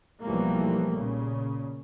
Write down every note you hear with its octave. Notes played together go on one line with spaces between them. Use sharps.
B1 E3 F3 G3 A3 A#3
A#2 C#3